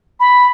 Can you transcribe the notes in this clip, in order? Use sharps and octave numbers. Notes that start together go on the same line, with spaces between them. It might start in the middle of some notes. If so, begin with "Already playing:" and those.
B5